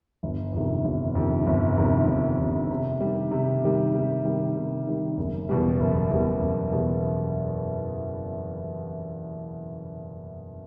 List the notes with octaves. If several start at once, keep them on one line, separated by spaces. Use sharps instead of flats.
G1
F2 C3 D#3
G1
F2 C3 D#3
G1
F2 C3 D#3
G1
F2 C3 D#3
C3
D#3 G3
C3
D#3 G3
C3
D#3 G3
C3
D#3 G3
F#1
E2 B2 G3
F#1
E2 B2 G3
F#1
E2 B2 G3